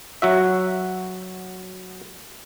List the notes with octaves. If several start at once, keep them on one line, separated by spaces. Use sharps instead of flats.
F#3 F#4 E5